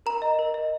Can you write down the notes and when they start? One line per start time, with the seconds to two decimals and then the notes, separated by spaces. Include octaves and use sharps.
0.06 A#4 A#5
0.22 D#5
0.39 A#4
0.54 D#5